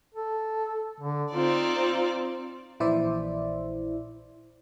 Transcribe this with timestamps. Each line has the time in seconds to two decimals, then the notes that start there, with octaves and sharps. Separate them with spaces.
0.14 A4
1.00 D3
1.34 C4 D#4 F4 D5
2.80 A#1 E3 E4 C5 D5 E5